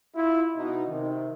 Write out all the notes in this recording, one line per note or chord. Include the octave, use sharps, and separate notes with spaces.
E4 F4
B2 D#4
C3 D#3